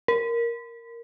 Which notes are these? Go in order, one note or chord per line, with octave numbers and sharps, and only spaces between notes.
A#4